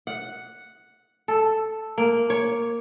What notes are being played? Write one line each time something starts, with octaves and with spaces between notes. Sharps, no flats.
F#5
A4
A#3
C#5